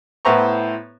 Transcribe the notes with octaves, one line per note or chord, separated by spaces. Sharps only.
A2 B3 E4 C5 A#5 C#6